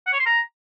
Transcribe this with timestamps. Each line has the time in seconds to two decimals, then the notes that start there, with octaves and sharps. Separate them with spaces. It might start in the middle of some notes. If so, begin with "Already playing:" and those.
0.07 F#5
0.13 C#5
0.20 C6
0.26 A#5